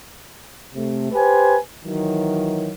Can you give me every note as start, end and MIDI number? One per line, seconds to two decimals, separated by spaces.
0.75 1.09 48
0.75 1.09 57
1.12 1.57 67
1.12 1.57 71
1.12 1.57 72
1.12 1.57 80
1.84 2.72 51
1.84 2.72 52
1.84 2.72 54